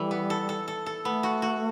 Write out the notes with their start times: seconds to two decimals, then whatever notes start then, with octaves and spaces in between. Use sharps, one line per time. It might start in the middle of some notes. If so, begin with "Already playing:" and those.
Already playing: E3 G3 A4
0.11 B3
0.30 A4
0.49 A4
0.68 A4
0.86 A4
1.05 A3 B3
1.23 F#4
1.42 F#4